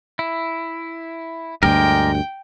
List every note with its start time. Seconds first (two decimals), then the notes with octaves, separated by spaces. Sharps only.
0.19 E4
1.63 D2 G2 G#3 G4 A#4 G5